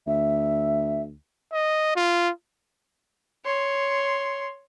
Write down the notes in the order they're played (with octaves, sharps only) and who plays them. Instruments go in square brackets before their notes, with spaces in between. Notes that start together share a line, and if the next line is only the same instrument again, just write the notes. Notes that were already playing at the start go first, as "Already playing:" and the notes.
[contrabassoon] D2 [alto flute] E5
[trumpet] D#5
F4
[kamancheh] C#5 C6